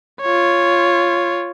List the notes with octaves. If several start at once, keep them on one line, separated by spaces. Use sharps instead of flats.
F4 C#5